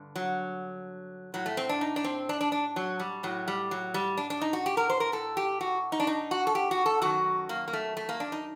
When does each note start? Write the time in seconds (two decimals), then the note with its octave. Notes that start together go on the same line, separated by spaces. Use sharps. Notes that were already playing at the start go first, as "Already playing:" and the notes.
Already playing: G2 D3
0.16 F#3
1.34 A2 F#3
1.46 A3
1.57 C4
1.69 D4
1.81 D#4
1.96 D4
2.04 C4
2.29 D4
2.41 D4
2.52 D4
2.76 F#3
3.00 G3
3.23 A2 F#3
3.48 G3
3.71 F#3
3.94 G3
4.17 D4
4.30 D4
4.41 D#4
4.53 F#4
4.66 G4
4.77 A#4
4.90 C5
5.00 A#4
5.12 A2 A4
5.37 G4
5.61 F#4
5.92 D#4
6.00 D4
6.07 D#4
6.31 F#4
6.47 A4
6.55 G4
6.71 F#4
6.86 A4
7.02 F#2 D#3 F#4
7.49 A#3
7.68 A#3
7.73 A3
7.97 A3
8.09 A#3
8.20 D4
8.32 D#4